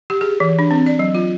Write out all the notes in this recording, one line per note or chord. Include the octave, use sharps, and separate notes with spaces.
G4
G#4
E3
D4
C4
D5
F#3
F4